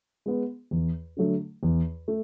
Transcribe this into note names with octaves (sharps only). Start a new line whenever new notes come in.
G#3 B3
E2
D3 F#3 A3
E2
A3